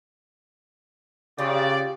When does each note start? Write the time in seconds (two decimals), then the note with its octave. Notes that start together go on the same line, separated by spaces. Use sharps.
1.39 C#3 F4 G4 D5